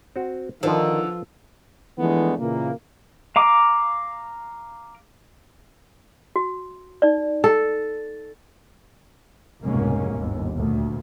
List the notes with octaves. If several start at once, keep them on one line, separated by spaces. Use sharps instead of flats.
C4 F#4
D3 D#3 F3 F4 B4 C5
E3 F3 G#3 A3 B3 D4
A#2 C#3 E3 A#3
F5 A#5 D6
F#4
D#4 D5
A4
F1 C#2 G#2 B2 A#3 C#4
G1 D#2
D2 A#2